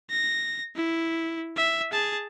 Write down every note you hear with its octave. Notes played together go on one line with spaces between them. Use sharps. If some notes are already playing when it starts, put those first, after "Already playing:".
A#6
E4
E5
G#4 A5